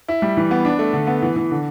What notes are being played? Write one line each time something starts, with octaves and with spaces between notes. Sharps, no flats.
E4
G3
E3
B3
D4
A3
D3
B3
E3
E3
D3